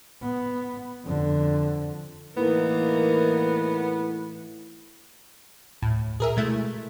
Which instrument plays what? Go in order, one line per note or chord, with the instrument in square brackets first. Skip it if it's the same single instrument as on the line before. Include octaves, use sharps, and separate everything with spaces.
[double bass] B3
F2 D3
[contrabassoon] A2 [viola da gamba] E3 D#4 A#4 [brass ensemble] A#3 [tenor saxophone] B3
[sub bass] D2 [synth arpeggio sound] A2
[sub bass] A#2 [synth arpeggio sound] G#4 A#4 E5
[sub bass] B2 [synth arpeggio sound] G#3 A3 E4